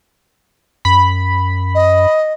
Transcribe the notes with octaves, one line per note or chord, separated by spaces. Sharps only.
F#2 B5
D#5